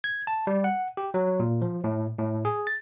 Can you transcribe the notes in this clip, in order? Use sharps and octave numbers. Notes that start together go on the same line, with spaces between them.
G#6
A5
G3
F#5
G4
F#3
A#2
F3
A2
A2
G#4
A6